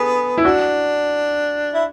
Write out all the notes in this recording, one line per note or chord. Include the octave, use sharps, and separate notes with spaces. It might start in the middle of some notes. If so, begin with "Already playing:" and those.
Already playing: B3 G#4 A4
E4
D4 F#4
E4